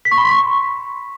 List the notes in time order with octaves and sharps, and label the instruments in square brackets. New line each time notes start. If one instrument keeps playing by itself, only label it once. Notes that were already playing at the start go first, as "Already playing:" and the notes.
[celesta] B6
C#6
B5
C6
C#6